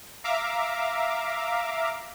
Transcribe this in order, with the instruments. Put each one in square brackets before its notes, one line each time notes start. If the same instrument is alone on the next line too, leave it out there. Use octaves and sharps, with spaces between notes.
[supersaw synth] E5 F5 A#5 D6